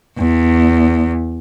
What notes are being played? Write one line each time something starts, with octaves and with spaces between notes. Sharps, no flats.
E2